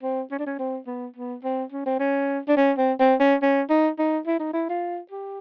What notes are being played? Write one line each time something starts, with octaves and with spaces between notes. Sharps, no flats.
C4
C#4
D4
C#4
C4
B3
B3
C4
C#4
C4
C#4
D4
C#4
C4
C4
C#4
C#4
D#4
D#4
E4
D#4
E4
F4
G4